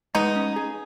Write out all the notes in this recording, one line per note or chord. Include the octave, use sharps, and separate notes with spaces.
G#3 B3 D#4
C#4
G#4